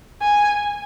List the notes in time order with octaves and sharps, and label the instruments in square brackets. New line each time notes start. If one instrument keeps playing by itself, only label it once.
[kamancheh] G#5